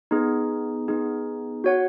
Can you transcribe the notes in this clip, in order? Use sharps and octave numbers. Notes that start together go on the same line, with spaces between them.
B3 D#4 G#4
B3 D#4 G#4
F#4 C#5 F#5